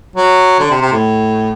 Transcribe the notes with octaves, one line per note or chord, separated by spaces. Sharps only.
F#3
D3
C3
C3
A2